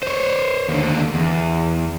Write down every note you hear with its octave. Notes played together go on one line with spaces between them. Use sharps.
C5 C#5
D#2 D3
E2